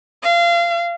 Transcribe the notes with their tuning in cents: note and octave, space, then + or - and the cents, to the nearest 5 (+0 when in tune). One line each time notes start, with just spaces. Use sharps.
F5 -25